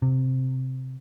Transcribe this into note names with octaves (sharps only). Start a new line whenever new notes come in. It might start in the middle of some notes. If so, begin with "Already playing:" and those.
C3